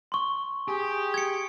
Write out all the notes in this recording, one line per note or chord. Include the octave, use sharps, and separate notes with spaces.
C6 C#6
G4 G#4
G#6 C#7